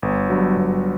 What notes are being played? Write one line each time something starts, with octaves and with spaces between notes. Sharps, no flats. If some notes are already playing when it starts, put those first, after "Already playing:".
G1
G2 F#3
G1